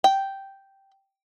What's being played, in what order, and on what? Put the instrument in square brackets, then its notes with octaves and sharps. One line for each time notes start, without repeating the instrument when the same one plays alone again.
[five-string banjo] G5